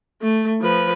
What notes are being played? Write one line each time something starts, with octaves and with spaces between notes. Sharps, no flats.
A3
F3 B4